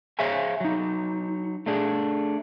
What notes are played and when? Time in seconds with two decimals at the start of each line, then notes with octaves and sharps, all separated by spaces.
0.19 G#4 C5 C#5 E5 F5 G#5
0.60 F#3 D#4
1.66 A3 D4 G#4